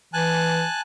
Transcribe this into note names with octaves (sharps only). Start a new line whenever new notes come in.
E3 G#5 A5 F#6